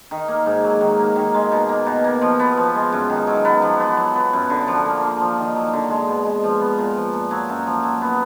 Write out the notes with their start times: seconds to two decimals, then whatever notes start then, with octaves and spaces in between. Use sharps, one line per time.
0.11 D#3
0.28 A#3
0.46 G#2
0.64 F#3
0.81 D#3
0.99 A#3
1.16 D#3
1.34 G#3
1.52 B2
1.69 A#3
1.86 B2
2.04 A#3
2.21 F3
2.39 B3
2.57 F3
2.75 G#3
2.92 F#2
3.10 D#3
3.27 F#3
3.45 B3
3.62 F3
3.80 B3
3.97 F#3
4.15 B3
4.33 F#2
4.50 D3
4.68 F3
4.85 A#3
5.03 D3
5.21 F3
5.38 D#3
5.55 F#3
5.73 D3
5.90 G#3
6.08 B2
6.26 G#3
6.44 F3
6.61 B3
6.78 A#2
6.96 F3
7.13 A#2
7.31 F#3
7.49 F#2
7.66 F3
7.84 F#3
8.02 B3